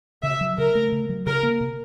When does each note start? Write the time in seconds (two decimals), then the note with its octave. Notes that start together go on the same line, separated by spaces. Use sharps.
0.23 C#3 E5
0.41 F#3
0.58 C#3 A#4
0.75 A3
0.92 C#3
1.09 F#3
1.26 C#3 A#4
1.43 A#3
1.61 C3